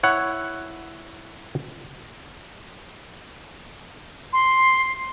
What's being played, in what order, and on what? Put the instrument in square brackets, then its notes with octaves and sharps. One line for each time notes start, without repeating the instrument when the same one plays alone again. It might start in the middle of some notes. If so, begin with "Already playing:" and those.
[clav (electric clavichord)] E4 C#5 F#5
[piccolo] C6